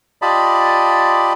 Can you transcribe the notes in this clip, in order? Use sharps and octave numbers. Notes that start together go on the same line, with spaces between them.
F4 G4 D5 D#5 A5 B5